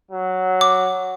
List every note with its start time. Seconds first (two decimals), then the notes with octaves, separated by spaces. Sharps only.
0.11 F#3
0.61 D6